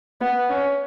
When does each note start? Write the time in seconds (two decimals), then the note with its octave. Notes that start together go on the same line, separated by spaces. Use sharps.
0.21 B3
0.50 C#4